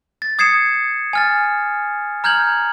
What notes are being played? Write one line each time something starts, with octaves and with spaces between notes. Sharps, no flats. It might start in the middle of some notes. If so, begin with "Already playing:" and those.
A6
D#6 G#6 C7 C#7 E7
G#5 F6 A6
A#5 F6 G6 G#6 F#7